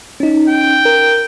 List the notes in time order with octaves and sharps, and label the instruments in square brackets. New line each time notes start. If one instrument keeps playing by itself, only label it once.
[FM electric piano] C#4 D#4
[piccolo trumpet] G5
[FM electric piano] A#4